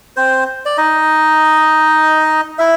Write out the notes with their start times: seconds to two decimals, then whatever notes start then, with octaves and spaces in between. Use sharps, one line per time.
0.17 C4 C5
0.65 D5
0.78 D#4 D#5
2.59 E4 E5